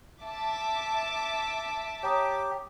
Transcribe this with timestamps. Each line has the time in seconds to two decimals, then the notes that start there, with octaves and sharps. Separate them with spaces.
0.23 E5 A5 D6
2.03 G4 C#5 A#5 D#6